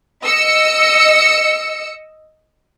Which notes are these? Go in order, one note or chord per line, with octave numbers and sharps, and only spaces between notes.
D#5 E6 C#7